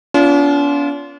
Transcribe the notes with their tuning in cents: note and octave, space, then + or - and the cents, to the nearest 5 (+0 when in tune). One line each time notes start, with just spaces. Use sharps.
B3 +0 D4 -45 F4 -10